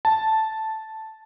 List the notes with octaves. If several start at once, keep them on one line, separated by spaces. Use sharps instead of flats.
A5